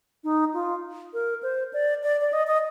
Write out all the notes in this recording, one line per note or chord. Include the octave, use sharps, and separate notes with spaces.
D#4
F4
A#4
C5
D5
D5
D5
D#5
D#5